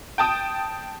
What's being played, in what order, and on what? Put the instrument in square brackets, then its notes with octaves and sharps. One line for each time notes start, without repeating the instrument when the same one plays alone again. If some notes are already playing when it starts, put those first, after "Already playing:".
[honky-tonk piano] G5 A5 D#6